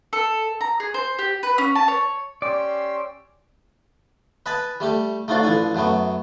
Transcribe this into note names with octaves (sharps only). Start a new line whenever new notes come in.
A4
A#5
G#4
C5
G4
B4
C#4
A5
C#5
C#4 G4 D5 C6 E6
B4 D#5 G#5 A5 B5
G3 A3 G4
A3 D#4 F4 F#4 C5 D5
A1 F3 D4 A4 G#5
F#2 F#3 A3 B3